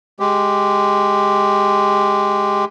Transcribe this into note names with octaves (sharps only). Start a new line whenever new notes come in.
G#3 G4